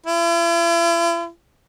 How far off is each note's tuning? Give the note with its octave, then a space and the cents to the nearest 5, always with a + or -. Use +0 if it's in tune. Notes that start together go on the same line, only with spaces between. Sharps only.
E4 +45